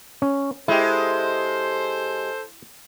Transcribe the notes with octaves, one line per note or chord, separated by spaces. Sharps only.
C#4
G#3 E4 G4 A4 C5